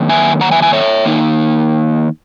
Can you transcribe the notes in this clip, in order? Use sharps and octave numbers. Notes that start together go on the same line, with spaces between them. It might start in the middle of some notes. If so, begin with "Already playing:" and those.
Already playing: F#2 D#3 A#3
E5 G#5
F#5 A#5
E5 G#5
E5 G#5
C#5 E5
D#3 A#3 D#4